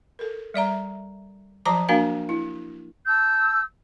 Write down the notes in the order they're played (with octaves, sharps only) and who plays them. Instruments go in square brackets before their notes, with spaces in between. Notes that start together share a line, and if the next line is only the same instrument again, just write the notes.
[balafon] A4 A#4
G3 D5 E5 A#5
F3 F#3 C5 A5 A#5 D6
A#3 D4 F#4 A#4 F5 G#5
E4
[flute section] A5 E6 G6